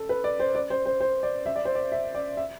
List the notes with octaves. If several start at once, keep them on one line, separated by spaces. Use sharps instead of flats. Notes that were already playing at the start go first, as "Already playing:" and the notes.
Already playing: A4
B4
D5
C5
D5
C5
C5
C5
D5
E5
D5
C5
D5
E5
D5
E5